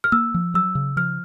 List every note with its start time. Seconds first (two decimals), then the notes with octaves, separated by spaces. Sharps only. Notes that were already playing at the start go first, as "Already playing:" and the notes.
0.04 F6
0.12 A#3 E6
0.34 F3
0.54 F#3 E6
0.75 C#3
0.96 F3 F6